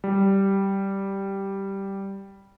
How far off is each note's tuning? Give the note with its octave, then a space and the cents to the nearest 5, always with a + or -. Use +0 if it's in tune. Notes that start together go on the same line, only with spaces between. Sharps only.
G3 -5